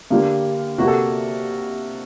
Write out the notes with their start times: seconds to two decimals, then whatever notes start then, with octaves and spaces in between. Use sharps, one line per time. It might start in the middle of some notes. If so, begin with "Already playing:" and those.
0.10 G2 D3 G3 A#3
0.78 C3 G3 A#3 F#4
0.88 A4